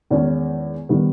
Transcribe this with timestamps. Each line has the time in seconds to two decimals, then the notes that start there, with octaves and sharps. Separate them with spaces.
0.10 E2 D#3 G#3 C#4
0.89 D#3 G3 B3